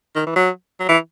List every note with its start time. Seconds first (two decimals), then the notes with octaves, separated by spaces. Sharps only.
0.16 D#3
0.26 E3
0.36 F#3
0.80 F#3
0.89 E3